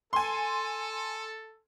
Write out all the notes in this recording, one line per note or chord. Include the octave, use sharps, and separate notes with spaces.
A4 G#5 C6